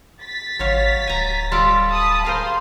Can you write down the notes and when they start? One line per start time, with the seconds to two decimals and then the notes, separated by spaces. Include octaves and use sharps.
0.23 A6 B6
0.59 G#1 F#3 C#5 F5
1.07 D1 G#5 A#5
1.52 G3 F4 A4
1.90 A5 B5 D#6
2.25 G#4 A#4 C5 F5 C6